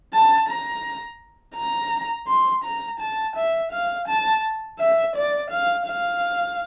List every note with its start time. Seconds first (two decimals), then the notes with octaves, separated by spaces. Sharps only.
0.13 A5
0.49 A#5
1.56 A#5
2.27 C6
2.64 A#5
3.00 A5
3.35 E5
3.72 F5
4.08 A5
4.79 E5
5.15 D5
5.50 F5
5.87 F5